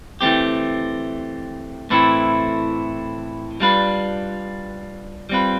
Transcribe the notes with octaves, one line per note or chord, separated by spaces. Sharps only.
E3 A3 C4 G4
A2 E3 A3 C4 E4
G3 D4 F4 B4
G3 C4 F4 B4